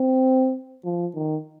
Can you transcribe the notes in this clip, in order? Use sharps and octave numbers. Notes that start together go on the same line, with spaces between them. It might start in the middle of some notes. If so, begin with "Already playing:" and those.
Already playing: C4
F3
D#3